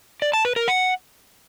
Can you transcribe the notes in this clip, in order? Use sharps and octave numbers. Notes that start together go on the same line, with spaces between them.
D5
A5
B4
A#4
F#5